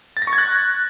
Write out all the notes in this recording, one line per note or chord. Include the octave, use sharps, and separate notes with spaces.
A6
A#6
C#6
G#6
F#6